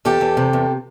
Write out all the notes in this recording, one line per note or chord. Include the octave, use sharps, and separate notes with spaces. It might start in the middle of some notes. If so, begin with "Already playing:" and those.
E2 G4 A4
E2
C3
E2